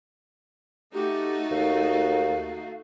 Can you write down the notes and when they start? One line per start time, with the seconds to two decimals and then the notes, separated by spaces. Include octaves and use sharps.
0.94 A3 D#4 F#4 G4
1.51 D#2 F5